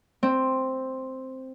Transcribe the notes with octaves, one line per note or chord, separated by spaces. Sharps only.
C4